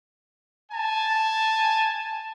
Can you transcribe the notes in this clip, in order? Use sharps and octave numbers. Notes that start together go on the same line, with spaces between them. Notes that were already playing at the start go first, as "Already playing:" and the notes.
G#5 A5